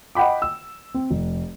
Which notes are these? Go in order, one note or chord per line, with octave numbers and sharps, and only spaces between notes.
D#5 F#5 G5 B5 D6
E6
C4
F1